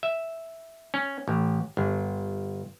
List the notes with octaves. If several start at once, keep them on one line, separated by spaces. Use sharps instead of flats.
E5
C#4
A1
G1